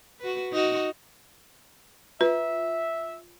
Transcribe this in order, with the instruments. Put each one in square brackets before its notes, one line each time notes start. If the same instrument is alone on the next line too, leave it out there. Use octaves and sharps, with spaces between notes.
[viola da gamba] F#4 B4
D#4 F#4
[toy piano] F4 [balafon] B4 [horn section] E5